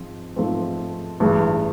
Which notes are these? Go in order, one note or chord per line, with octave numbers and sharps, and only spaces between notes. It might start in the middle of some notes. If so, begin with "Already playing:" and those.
Already playing: G#2 F3 C4
G#2 F3 A3 C4
A1 G2 E3 G#3